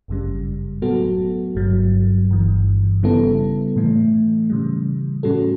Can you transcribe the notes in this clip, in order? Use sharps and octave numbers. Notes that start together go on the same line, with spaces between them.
G1 F#2 C#3 G3
A2 F#3 B3 F#4 A4
G1 G2 F#3
G1 G2 E3
C#3 G3 B3 E4 A4
A2 E3 A3
C#3 E3 G3
A2 G3 C#4 F#4 A4